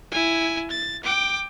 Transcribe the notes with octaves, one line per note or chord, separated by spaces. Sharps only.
E4 G#5
A6
G5 D6